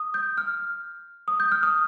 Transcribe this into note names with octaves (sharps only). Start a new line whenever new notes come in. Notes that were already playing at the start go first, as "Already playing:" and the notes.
Already playing: D#6
G6
F6
D#6
G6
F6
D#6